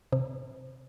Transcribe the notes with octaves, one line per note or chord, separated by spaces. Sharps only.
C3